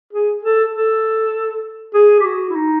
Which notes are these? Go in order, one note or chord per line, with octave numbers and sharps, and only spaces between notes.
G#4
A4
A4
G#4
G4
F#4
E4
D#4